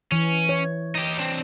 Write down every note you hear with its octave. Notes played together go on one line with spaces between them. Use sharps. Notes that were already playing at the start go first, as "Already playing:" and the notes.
E3 C#4
C#5
D#4 G4
C4 D4